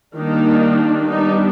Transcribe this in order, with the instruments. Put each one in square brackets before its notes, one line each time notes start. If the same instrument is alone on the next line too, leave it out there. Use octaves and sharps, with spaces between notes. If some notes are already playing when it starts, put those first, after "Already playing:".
[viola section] D#3 G3 A#3 D4 D#4
G3 B3 D4 D#4